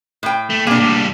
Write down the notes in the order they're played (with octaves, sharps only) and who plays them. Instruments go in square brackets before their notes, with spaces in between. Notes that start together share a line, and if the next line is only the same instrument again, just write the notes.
[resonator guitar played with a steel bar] A2 G5
[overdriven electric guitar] A3
[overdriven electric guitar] B2 G#4 [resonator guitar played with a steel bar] A#3 D4
[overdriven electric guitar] A2 G3